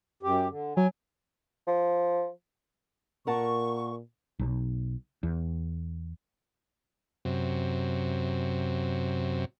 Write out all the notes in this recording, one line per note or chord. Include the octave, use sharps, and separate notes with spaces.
F#2 G4
D3
F#3 G#5
F3
A#2 A#4 F#5 A5 C#6
B1
E2
F#2 C3